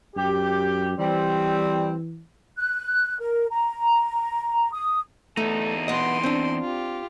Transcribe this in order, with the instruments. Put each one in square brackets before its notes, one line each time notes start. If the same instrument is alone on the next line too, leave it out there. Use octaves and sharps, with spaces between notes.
[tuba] F#2 [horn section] G4
[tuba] E3 [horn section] G3 C4
[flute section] F#6
A#4
A#5
D#6
[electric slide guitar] E2 D#4 [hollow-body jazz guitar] A3 [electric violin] A4
[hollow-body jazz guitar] B3 D#5 [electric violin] C6 D7
[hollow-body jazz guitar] C4 D4
[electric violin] F4 G4